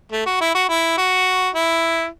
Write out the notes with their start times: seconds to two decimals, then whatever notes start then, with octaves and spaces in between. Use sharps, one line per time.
0.12 A3
0.26 F#4
0.41 E4
0.54 F#4
0.69 E4
0.98 F#4
1.55 E4